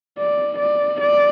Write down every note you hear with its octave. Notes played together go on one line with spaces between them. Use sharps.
D5
D5
D5